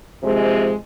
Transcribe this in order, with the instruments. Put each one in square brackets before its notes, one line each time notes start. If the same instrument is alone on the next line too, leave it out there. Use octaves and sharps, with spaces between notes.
[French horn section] C3 F3 G#3